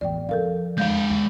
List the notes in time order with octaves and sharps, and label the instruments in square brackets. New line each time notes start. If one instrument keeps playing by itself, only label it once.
[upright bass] A1 E2 [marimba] D5 G5
[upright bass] F2 [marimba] A4 A#4 F5
[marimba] E2 F5 G6 [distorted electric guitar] G#3 D5
[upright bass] D#2